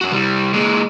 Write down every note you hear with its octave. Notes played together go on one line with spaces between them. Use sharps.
F#2 F#4
C2 G3
A#2 G#3